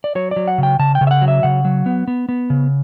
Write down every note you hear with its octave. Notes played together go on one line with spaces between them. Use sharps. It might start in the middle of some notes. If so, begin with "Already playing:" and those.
D5
F#3 C#5
D5
F#3
F#5
C#3 G5
C#3 A5
G5
C#3
E5
F#5
F#3
E5
C#3 F#5
F#3
B3
B3
B3
C#3